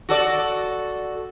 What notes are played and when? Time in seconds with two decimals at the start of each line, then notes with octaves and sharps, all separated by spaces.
0.09 F#4 A4 D5